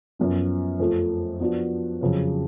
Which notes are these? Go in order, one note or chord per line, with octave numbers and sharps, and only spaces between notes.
F#2 F3 B3
F2 F3 A3
F3 B3 D4 F#4
F2 C#3 F#3 C#4